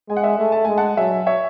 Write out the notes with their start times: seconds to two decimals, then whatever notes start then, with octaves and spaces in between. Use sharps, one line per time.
0.09 G#3 G#5
0.17 F#5
0.23 E5 G#5
0.39 A3
0.52 A5
0.65 G#3 G#5
0.77 F#5 A5
0.97 F#3 E5 G#5
1.27 C#5 E5